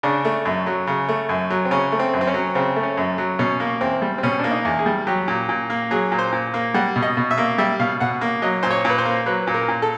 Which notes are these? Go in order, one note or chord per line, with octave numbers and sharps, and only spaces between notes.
C#3 D4
A3
F#2
F#3
C#3
A3
F#2
F#3
C4
C#3 C#4
A3
C4
F#2
C4
C#4
F#3
C#3 C4
A3
C#4
F#2
F#3
B2 C#4
A#3
E2 C4
G3
C4
B2 C#4
A#3 D4
D#4
E2
G#4
G3
F#3 G4
A#2
A#2
A#3
F#3 G#4
A#2
C5
A#2
A#3
G3 F#5
B2
D#5
B2
E5
A#3
G3 E5
B2 F5
B2 F#5
A#3
F#3 D#5
A#2 C5
C#5
A#2 B4
C5
A#3
F#3 B4
A#2
A#4
A#2
A4